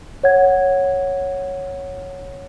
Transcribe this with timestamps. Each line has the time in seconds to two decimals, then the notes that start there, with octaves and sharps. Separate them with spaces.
0.23 C#5 F#5 G#6